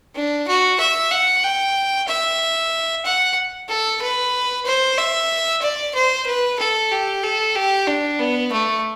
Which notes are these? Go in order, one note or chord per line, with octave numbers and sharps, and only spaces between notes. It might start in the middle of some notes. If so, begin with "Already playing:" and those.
D4
F#4
E5
F#5
G5
E5
F#5
A4
B4
C5
E5
D5
C5
B4
A4
G4
A4
G4
D4
B3
A3